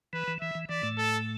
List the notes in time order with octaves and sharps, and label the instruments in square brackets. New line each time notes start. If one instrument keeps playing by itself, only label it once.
[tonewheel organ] E3 [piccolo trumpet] B4
[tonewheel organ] E3
[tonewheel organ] E3 [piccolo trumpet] E5
[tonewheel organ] E3
[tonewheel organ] E3 [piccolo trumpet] D5
[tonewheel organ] A2 A3
[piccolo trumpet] A4